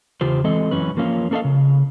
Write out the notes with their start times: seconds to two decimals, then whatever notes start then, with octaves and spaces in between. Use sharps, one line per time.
0.21 E2 C#3 F4 G4 C5
0.44 E3 G#3 C4 A4 D#5
0.71 F#2 E3 C#4 B4
0.97 F3 A#3 C#4 F4
1.31 A#3 C#4 A4 B4 D#5 F5
1.44 C#3